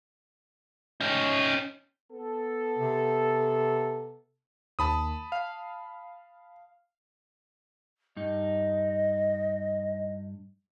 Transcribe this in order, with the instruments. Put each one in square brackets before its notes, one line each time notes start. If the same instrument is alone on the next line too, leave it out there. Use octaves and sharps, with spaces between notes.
[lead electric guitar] C#4 D#4
[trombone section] B3 A4
[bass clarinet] C3
[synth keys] D#2 [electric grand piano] A5 B5 D#6
[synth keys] F5
[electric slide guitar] G2 D#4 [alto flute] D#5